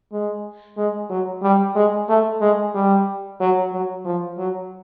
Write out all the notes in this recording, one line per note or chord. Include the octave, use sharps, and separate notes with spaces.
G#3
G#3
F#3
G3
G#3
A3
G#3
G3
F#3
F#3
F3
F#3